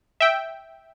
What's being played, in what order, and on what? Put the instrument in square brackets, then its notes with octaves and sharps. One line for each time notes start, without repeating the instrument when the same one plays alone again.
[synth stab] E5 G5